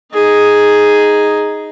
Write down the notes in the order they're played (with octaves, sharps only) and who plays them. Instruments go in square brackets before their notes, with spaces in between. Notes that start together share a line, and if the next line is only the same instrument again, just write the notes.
[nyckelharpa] D#4 G#4